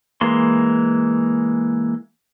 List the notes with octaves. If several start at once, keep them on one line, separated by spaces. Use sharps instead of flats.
E3 G#3 A#3 C6